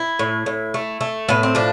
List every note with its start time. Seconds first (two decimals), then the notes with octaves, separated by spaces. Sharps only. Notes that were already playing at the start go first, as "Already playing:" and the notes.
Already playing: E4
0.19 A2
0.46 A2
0.74 A3
1.01 A3
1.29 A2 B3
1.43 C4
1.55 F3 D4